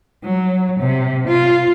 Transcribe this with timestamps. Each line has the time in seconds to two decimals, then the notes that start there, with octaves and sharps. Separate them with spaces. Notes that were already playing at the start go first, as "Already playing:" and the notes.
0.24 F#3
0.80 C3
1.27 F4